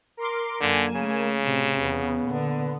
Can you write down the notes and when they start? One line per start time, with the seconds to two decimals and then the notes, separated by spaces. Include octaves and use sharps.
0.17 A#4 C6 D6
0.61 F#2 D3 A#3 G#5 E7
0.96 C#3 A3
1.42 A2 C3 E7
1.81 E2 B3
2.23 A#2 D3